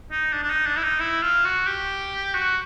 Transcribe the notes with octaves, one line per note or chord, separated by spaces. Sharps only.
D#4
D4
D4
D#4
D4
E4
D#4
E4
F4
F#4
G4
F#4